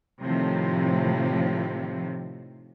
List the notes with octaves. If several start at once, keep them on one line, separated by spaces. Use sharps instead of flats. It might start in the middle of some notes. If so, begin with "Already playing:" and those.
A2 C3 D#3 F3